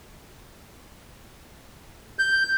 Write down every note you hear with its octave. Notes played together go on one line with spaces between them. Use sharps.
G6